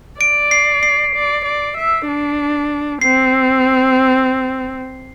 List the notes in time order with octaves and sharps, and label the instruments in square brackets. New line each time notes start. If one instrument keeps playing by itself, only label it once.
[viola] D5 [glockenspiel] D7
[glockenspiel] C7
C7
[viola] D5
D5
E5
D4
[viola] C4 [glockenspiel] C7